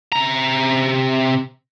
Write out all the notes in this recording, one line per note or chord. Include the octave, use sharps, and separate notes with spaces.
C3 A#5